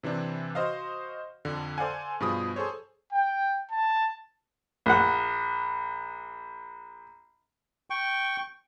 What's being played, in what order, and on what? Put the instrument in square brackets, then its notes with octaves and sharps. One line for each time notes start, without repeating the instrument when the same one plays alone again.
[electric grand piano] C3 E3 C4 D4
F#4 C5 D#5 F5
F2 D3
A4 C5 D5 F5 F#5 G#5
G2 B2 F3 G#4 B5 D#6
G#4 A4 C5 C#5
[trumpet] G5
A5
[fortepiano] A#1 F#5
[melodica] G5 C#6